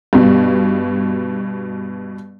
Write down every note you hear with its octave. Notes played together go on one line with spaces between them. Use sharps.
G2 B2